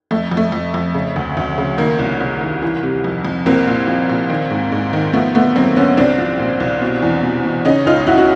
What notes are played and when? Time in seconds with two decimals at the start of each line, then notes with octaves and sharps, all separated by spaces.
0.11 F2 A3
0.31 F2
0.37 A3
0.52 F2
0.74 F2
0.94 C#3
1.16 D2
1.37 D2
1.58 C#3
1.78 D#3 A#3
1.99 C2
2.20 C2
2.41 D#3
2.62 E3
2.83 C3
3.04 F2
3.25 F2
3.46 C2 A#3 C4
3.67 A#2
3.88 F3
4.09 A#2
4.30 D#3
4.50 G#2
4.72 G#2
4.93 D#3
5.13 F3 A3 B3
5.35 D3 A3 B3
5.56 F#2 A#3 C4
5.76 D3 B3 C#4
5.97 C2 C4 D4
6.18 F3
6.39 A#2
6.60 C2
6.82 B2
7.02 E2
7.23 B2
7.44 B2
7.65 C#3 C#4 D#4
7.86 C#2 D#4 F4
8.07 C#2 E4 F#4
8.18 F#4